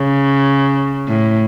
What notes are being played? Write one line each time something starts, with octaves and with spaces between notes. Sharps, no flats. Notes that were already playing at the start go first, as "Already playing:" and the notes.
Already playing: C#3
A2